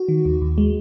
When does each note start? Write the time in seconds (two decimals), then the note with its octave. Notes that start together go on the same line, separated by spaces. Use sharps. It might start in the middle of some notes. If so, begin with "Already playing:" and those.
Already playing: F#4
0.09 D#3
0.25 D#2
0.42 D#2
0.58 G#3